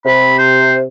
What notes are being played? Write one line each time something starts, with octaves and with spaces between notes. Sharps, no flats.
C3 B5
C5